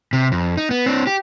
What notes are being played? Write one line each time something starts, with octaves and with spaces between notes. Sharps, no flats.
C3
F2
D#4
B3
C4 D4
G4